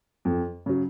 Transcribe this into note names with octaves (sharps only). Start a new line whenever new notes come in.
F2
C#3 F#3